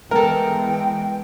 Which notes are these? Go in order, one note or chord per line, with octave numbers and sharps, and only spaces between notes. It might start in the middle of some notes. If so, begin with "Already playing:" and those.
E3 G#3 B3 A4 A#4 G5